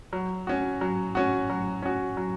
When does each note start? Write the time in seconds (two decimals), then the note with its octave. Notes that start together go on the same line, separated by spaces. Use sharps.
0.13 F#3
0.47 C#4 F#4
0.81 F#3
1.15 C#4 F#4
1.50 F#3
1.82 C#4 F#4
2.17 F#3